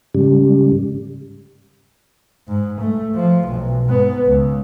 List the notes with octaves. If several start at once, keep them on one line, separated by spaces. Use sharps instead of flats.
G#2 C#3 G3
G#2
A3
F3
B1
G#2 B3
C#2